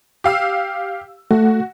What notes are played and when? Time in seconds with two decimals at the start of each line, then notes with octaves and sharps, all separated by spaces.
0.24 G4 F5 E6
1.31 A3 F#4